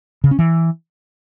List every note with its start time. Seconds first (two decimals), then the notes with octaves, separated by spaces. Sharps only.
0.24 C#3
0.31 C#4
0.39 E3